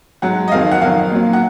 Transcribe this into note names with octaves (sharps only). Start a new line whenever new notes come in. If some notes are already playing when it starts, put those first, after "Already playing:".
G#2 F#3 F#5
D#5
F2 D#3 F#3 F5
F#5
F2 D#3 F#3 F5
A#2 F#3
F#5